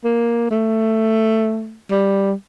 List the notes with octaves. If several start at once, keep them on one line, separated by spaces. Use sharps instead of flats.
A#3
A3
G3